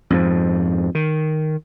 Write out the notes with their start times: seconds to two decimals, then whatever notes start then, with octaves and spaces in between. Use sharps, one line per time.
0.10 F2 G#2 F3
0.95 D#3